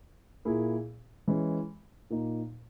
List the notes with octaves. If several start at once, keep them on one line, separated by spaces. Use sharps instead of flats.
A#2 A#3 E4 G#4
E3 G#3 C#4
A#2 A#3 D#4